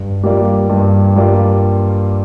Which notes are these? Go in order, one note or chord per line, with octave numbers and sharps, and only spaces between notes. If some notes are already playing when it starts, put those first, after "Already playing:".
Already playing: G2
G3 A#3 F4 D5
G2
G3 A#3 F4 D5